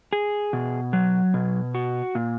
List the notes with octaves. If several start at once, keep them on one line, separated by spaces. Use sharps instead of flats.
G#4
B2
F#3
B2
F#4
A#2